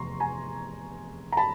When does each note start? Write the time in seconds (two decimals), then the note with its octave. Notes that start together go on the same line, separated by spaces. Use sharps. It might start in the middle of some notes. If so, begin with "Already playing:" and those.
Already playing: F1 E2 C3 A#5 C6 C#6
0.20 G#5 A#5
1.32 A#5
1.37 A5 B5